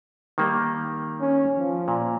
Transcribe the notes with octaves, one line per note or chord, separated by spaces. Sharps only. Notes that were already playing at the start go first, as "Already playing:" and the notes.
D#3 G3 A#3
C#4
F3
A#2